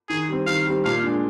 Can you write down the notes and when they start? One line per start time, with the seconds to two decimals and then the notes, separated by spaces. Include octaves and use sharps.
0.09 D#3 G#4
0.29 G3 C4
0.47 D#3 F5
0.66 G3 C4
0.85 A#2 F5
1.03 G#3 D4